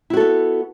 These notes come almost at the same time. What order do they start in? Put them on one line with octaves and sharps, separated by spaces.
E4 F#4 A4 B3